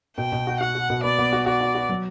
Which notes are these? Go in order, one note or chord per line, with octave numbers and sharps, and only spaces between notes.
B2 G5
B2
F#4
F#4 F#5
F#4
B2
B3 D5
B3
F#4
F#4 D5
F#4
F#4
F#3